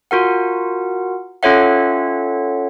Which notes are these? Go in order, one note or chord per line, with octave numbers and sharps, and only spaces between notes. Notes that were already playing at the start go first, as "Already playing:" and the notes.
F4 F#4 A#4 F#5
C#4 F4 A4 C#5 E5 F#5